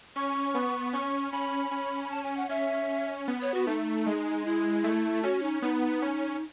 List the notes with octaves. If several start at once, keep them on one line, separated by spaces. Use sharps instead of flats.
C#4 C#6
B3
C#4 C#6
C#4 B5
C#4
B5
A5
G#5
F#5
C#4 E5
B3
C#5
F#4
A3 D#4
G#3
E4
A3
C#4 F#4
D#4
B3 D#4
C#4